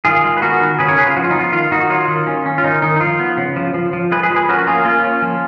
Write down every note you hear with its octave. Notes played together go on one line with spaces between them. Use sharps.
D#3 F4 G#4
G#3
B4
B3 F#4 A#4
D#3
C#3 G#4 B4
A#4 C#5
C#3 G#4 B4
F4
F3 F#4
F4
D#4
B3 F4
D#3 F4
D#3 D#4 F#4
F#3 F4
D#3
C#4
C#4
F4
D#3 D#4
D#3 D#4
D#4
F3 F4
B3
C#3
F3
F3
F3
G#3 G#4 B4
G#4 B4
F3
G#4 B4
C#4 F#4 A#4
F#4
A#3 F4 G#4
A#3 F4
C#4
F3